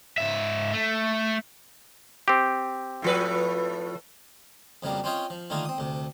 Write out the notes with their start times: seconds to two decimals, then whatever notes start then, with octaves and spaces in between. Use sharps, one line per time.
0.18 G#2 E5
0.73 A3
2.28 C4 G4
3.02 A2 F3 B4
4.83 F2 C#3 F#3 G3 A#3
5.04 C4 C#4 F4 C5 C#5 D#5
5.30 F3
5.50 D3 D#3 A3 A#3 F4 G#4
5.65 C4 D#6
5.78 D2 C3